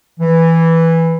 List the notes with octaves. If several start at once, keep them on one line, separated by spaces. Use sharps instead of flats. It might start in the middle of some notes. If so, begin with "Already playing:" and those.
E3